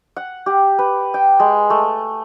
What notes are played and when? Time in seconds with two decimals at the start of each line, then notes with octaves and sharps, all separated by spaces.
0.17 F#5
0.46 G4
0.79 B4
1.14 G5
1.40 G#3
1.70 A3